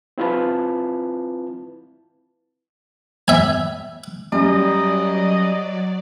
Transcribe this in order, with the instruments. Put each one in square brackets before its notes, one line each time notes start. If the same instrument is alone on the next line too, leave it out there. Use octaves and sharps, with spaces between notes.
[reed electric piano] C4 E4 F4 B4 A5
[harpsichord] E5 G#5
[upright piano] F#2 [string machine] F#3 D5 [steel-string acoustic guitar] G3 [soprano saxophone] D#5